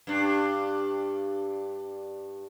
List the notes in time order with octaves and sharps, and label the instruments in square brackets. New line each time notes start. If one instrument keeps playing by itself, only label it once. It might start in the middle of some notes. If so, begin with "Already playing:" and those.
[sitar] G2 D4